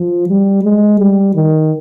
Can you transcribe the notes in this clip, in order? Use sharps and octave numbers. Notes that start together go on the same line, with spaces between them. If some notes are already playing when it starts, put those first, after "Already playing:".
Already playing: F3
G3
G#3
G3
D#3